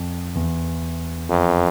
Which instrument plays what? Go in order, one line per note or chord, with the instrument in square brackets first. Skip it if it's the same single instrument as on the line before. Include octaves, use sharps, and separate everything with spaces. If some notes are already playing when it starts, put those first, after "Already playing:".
Already playing: [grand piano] F2
E2
[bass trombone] F2